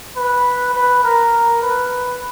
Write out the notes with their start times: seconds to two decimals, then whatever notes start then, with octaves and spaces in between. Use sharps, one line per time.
0.16 B4
0.74 B4
1.04 A#4
1.62 B4